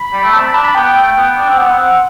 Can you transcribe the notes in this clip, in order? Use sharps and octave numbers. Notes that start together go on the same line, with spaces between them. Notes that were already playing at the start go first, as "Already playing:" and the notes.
Already playing: B5
G3
A3
C4 A5
B5
D4 A5
B5
B3 G5
A3
B3
D4
C4
B3 F#5
C4